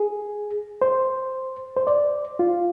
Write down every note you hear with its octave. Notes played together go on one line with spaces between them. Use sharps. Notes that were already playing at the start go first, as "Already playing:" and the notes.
Already playing: G#4
C5
C5
D5
F4